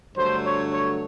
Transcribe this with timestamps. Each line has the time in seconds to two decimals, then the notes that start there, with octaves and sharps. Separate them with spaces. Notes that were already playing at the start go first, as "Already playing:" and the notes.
0.15 G2 D3 F#3 A3 C5
0.45 C#5
0.72 C#5